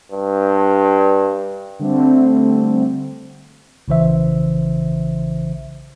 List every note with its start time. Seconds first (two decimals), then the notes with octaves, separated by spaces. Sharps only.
0.12 G2
1.79 D3 G3 A3 C4
3.88 A#1 C#3 E3 C5 E5